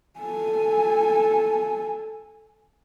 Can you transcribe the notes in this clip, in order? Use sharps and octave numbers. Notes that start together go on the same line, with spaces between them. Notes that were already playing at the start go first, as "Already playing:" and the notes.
A4 G#5